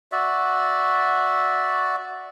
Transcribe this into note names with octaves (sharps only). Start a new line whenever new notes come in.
F#4 D5 E5